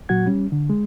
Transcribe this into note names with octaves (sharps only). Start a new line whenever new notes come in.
A#2 F#3 F#4 F#5 G#6
G3 C#4
D3
G#3